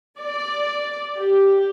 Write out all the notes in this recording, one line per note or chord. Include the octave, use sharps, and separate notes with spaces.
D5
G4